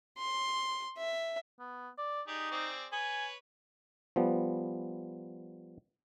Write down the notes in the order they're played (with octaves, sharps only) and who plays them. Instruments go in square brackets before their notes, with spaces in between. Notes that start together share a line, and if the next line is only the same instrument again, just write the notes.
[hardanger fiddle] C6
E5
[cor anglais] B3
D5
[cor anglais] D#4 [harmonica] G4 G#4 D5
[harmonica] C4 G#4 D5
[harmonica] B4 C#5 [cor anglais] G#5
[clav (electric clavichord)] F3 G3 B3